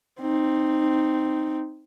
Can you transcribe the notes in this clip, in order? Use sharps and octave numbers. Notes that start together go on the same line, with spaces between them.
C4 D#4